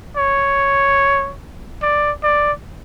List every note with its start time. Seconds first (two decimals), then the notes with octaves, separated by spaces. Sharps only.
0.17 C#5
1.82 D5
2.23 D5